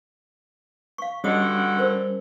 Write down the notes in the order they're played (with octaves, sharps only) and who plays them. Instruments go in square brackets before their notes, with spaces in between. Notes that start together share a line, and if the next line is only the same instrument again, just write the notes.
[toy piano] F5 C#6
[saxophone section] G2 D3 F#4 [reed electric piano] G3 C#4 [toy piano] D#5 D#6
[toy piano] A#4 C5